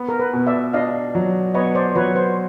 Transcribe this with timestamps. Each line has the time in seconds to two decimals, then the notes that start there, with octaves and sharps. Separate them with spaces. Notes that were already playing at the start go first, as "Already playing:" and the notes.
Already playing: B3
0.09 A#4
0.20 B4
0.33 B2
0.47 D5 E5
0.73 D4 D#5 F5
1.15 F#3
1.54 B3 C#5 D#5
1.75 C5 D5
1.95 F#3 B4 C#5
2.16 C5